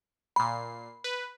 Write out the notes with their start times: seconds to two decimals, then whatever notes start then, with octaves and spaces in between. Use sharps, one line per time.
0.36 A#2 B5 C7
1.04 B4